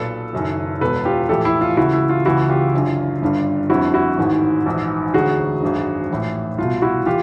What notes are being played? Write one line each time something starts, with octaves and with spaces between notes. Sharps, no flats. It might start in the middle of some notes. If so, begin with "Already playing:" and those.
Already playing: B1 A#2 A4 B4
F#1 F#2 D#3
E1 E2 B2 A4 B4
F4 G4
A#1 A2 E3 G4 A4
E4
F4
C#2 C#3 E3 E4 F#4
E4
F4
C#2 C#3 E3 E4 F#4
F4 G4
F#1 F#2 D3
G1 G2 D3
G1 F2 D3 E4 F#4
E4 F#4
A1 G#2 D#3
A#1 G#2 E3
E1 D2 D3 F#4 G#4
G#1 F#2 D3
A#1 A2 E3
C2 B2 F4
E4 F#4
E3 F4 G4